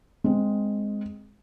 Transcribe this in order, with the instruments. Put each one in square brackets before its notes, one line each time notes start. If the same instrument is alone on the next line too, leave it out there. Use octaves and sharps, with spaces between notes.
[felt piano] G#3 C4